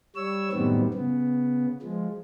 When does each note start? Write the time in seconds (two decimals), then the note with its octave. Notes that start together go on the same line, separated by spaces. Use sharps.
0.16 G3 C#5 E6
0.52 F#2 A2 D#3 G3 B3 C4
0.94 C#3 B3
1.82 F3 G#3